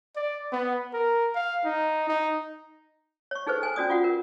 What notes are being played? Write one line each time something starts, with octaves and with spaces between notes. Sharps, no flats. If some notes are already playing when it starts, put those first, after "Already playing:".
D5
B3
A#4
F5
D#4
D#4
C#5 C#6
D#4 G#4 A4 B4 C5
C5 G#5
C#4 F#4 D5 D#6
F4 F#4 F#5
A#4